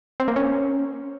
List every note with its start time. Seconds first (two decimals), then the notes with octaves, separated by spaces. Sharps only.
0.20 C4
0.28 A#3
0.36 C#4